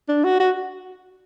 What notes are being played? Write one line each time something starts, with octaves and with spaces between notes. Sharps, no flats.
D4
F#4
F#4